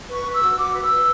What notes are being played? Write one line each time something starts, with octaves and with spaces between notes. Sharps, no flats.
B4 C#6
B4
E6
F#4
F#4 D6
B4
E6
B4